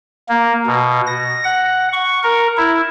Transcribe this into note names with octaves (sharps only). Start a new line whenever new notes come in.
A#3
B2
A#6
F#5
C#6
A#4
E4